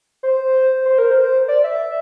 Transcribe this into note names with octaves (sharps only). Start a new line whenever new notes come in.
C5
C5
A#4
C5
D5
E5